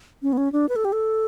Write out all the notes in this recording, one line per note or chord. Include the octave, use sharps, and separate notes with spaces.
C#4
B3
C#4
D4
B4
A4
G4
A4